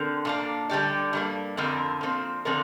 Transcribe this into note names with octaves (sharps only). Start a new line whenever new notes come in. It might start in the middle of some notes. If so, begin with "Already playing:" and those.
Already playing: D3 C4 A#4
A#2 A#3 D4
D3 G3 A#3 G4 D5
G2 G3 A#3
F2 D3 F3 C4 A#4
A#2 F3 C4
D3 F3 C4 A#4 D5